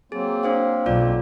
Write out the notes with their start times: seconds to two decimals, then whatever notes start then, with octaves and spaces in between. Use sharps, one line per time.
0.12 F#3 A#3 C4 G#4
0.43 D4 C5 F5
0.86 B1 F4 D5